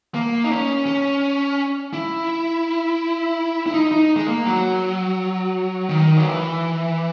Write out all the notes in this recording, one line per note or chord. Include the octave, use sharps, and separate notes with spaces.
A#3
D#4
C#4
C#4
E4
E4
D#4
D#4
G#3
A#3
F#3
D#3
F#3
E3